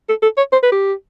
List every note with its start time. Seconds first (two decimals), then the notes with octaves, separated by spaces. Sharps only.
0.09 A4
0.23 A4
0.37 C#5
0.52 C5
0.63 B4
0.72 G4